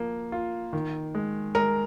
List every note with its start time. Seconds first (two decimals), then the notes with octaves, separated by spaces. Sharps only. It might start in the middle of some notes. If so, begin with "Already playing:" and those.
Already playing: F3 A#3
0.32 F4
0.73 D#3
1.15 G#3
1.55 G#3 A#4